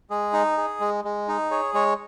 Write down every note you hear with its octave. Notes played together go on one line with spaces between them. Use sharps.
G#3 G#4
D#4
G#4
G#3
G#3
D#4
G#4 C#5
G#3 C#5